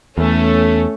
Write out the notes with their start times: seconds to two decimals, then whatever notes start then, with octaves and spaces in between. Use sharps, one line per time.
0.18 E2 A3 C#4